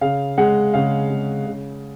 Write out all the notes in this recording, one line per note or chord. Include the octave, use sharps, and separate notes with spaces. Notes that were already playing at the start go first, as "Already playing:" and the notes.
C#3 F5
G#3 F#5
C#3 F5
G#3
C#3